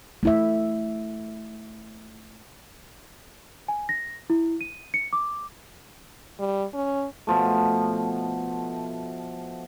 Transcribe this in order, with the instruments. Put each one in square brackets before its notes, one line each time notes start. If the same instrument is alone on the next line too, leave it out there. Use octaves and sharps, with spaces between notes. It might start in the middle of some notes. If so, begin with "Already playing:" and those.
[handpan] A3 E4 E5
[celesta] G#5
A#6
E4
D#7
C#7
D6
[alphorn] G3
C#4
[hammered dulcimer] B2 F3 A3